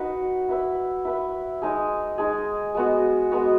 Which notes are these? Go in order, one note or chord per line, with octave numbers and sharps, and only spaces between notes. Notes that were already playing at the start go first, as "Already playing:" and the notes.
Already playing: D#4 F#4 B4
E4 B4 E5
E4 B4 E5
G#3 D#4 G#4
G#3 D#4 G#4
G#3 B3 F#4
G#3 B3 F#4